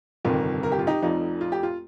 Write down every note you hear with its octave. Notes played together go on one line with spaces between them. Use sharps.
G1 F2 C3 D#3 G3 F4 A#4
A#4
G4
F4
D#4 G4
F1 F2 F3 D#4
F4
G4
F4